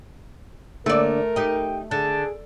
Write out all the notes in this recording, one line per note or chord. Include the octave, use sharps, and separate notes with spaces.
D3 A3 A#3 A#4 D5
D#4 G4 G5
D3 G#4 A5